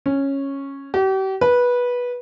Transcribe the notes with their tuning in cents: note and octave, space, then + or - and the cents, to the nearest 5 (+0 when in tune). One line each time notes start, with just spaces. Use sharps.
C#4 -10
G4 -40
B4 -15